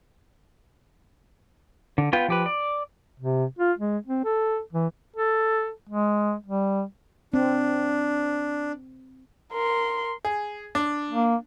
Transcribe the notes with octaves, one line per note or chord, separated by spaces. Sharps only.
D3
B3 F4 B4 G5
F3 G4 B4
D5
C3
F4
G#3
C4
A4
E3
A4
G#3
G3
C4 D4
A#4 C6
G#4
D4
A#3